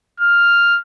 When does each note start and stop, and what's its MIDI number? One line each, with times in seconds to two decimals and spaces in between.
0.20 0.79 89